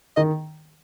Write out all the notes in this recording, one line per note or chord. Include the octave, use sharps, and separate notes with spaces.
D#3 D#5